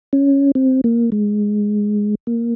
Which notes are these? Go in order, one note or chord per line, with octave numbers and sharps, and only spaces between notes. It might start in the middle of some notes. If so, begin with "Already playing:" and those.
C#4
C4
A#3
G#3
A#3